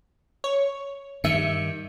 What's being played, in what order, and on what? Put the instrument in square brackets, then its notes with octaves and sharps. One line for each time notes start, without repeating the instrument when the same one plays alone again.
[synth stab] C#5
[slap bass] G2 D#3 [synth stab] E5 C#7